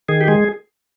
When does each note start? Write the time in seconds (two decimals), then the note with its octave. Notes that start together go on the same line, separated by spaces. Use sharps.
0.09 D#3 G#4
0.21 G4
0.28 G#3 G#4